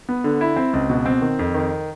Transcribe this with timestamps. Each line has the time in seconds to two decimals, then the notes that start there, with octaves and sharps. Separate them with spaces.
0.09 B3
0.24 D3
0.41 E4
0.56 C4
0.73 C#2
0.90 B2
1.06 C4
1.22 D#3
1.39 F2
1.54 D#3